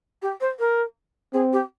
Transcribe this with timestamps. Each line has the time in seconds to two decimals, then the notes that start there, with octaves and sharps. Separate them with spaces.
0.22 G4
0.40 C5
0.59 A#4
1.33 C4 G#4
1.52 G4